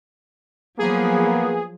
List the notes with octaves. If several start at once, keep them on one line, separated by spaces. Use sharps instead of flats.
F3 F#3 A#3 B3 G#4